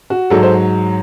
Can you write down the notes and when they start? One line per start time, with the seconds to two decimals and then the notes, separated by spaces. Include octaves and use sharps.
0.10 F#4
0.30 G#2 F#3 A4
0.43 C5